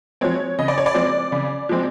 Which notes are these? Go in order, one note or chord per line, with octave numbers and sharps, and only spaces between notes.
F3 G#3 C4 C#5
C#3 D#5
D5
C#5
D5
F3 G#3 C4
C#3
F3 G#3 C4